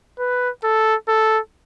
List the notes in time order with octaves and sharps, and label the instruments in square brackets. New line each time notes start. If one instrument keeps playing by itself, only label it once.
[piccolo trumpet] B4
A4
A4